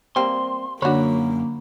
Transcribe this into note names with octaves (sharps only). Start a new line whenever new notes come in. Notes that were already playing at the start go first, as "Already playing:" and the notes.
G3 A#3 C4 C6
F#2 D3 A#3 D4 F#4 C#5 B5